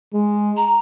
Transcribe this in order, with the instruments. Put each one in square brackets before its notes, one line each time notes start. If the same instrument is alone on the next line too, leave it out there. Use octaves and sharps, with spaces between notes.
[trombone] G#3
[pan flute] A#5